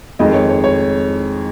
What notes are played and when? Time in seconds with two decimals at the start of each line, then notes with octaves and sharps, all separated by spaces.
0.19 F2 D#3 G#3 D#5
0.34 C#5
0.49 C#5
0.64 C#5